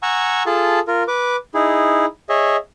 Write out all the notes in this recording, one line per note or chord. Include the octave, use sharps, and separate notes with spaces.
F#5 G#5 A#5 C#6 E6
F4 G#4 A4 A5
F4 A#4
B4 D6
D#4 E4 G#4
G#4 C#5 D#5 E5